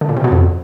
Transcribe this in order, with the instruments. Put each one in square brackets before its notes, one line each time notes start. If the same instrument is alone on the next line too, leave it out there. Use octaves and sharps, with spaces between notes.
[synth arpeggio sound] D3
A#2
C3
B2
F2